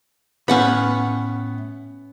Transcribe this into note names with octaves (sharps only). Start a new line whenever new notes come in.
A2 B3 C#4 F5 F#5 B5